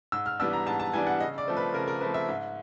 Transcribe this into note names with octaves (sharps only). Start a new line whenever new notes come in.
G#2 E6
F6
E3 G3 B3 D4 E6
A#5
G#2 A5
A5
E3 G3 B3 D4 G#5
F#5
C#3 D#5
D5
F3 A3 C4
B4
C#3 A#4
A#4
F3 A3 C4 B4
E5
G#2